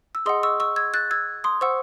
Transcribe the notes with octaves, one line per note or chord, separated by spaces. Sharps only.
E6
G#4 D#5 F#5 C6 D#6
C#6 E6
C#6 E6
E6 G#6
F#6 A6
E6 G#6
C6 D#6
C5 F#5 C#6 E6